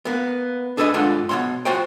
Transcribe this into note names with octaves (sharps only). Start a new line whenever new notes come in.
A#3 B3
D4 G#4 A4 B4 D5 D#5
G2 G#3 D4 F4 A4 F#5
B2 G#3 C#5 F#5 C6
F4 F#4 C5 C#5 G5